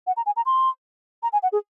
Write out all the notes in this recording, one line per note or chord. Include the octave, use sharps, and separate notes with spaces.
F#5
A#5
G#5
A#5
C6
A#5
G#5
F#5
G#4